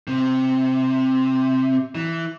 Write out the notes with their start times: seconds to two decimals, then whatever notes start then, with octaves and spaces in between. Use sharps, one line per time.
0.08 C3
1.95 E3